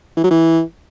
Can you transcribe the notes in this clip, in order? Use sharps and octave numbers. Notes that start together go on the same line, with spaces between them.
E3
F#3
E3